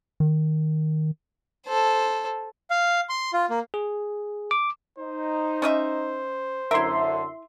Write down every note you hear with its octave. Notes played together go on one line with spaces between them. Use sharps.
D#3
A4 C5
F5
C6
F4
A#3
G#4
D6
D#4 C5
C#4 D#5 E5
F#2 D3 E4 A#4 E5 C6